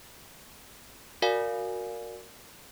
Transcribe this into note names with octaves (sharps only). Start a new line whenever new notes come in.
F#4 A#4 D5 F5 G#5